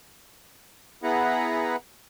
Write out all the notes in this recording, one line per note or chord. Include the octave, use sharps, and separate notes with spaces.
B3 E4 G#4 B4 F#5 A#5